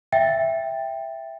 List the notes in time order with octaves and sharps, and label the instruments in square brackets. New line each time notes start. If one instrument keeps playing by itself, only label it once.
[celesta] E5 G5 A6